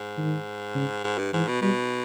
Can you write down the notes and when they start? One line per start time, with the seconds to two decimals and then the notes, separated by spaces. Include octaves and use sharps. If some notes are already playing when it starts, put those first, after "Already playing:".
Already playing: G#2
0.18 D#3
0.75 C#3
1.04 G#2
1.18 G2
1.33 G#2 E3
1.48 B2
1.62 B2 G3